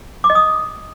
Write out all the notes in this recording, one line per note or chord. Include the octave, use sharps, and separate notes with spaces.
D6
D#5
D#6